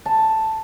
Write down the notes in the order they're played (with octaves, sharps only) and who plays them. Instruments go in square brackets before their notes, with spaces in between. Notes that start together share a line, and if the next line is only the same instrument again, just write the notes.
[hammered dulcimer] A5